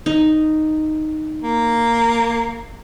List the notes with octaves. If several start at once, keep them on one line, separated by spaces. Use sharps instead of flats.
D#4
A#3